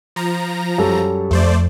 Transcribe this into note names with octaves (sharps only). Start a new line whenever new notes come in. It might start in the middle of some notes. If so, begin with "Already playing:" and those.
F3 A#5
F#2 G3 A4
F2 A3 C5 D5